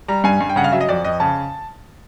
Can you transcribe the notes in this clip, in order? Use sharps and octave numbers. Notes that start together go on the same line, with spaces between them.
G3 A#5
G2 G#5
G2
G5
C#3 F#5
F5
F#3 E5
D#5
F2 D5
F2 D#5
C#3 A5